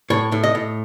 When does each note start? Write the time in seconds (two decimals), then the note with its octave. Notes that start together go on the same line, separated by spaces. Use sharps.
0.10 A2 C#5
0.32 A2
0.44 D#5
0.55 A2